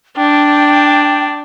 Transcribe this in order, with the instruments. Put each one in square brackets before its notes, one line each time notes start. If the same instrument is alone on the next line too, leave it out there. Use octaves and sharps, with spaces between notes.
[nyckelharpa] D4 [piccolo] G5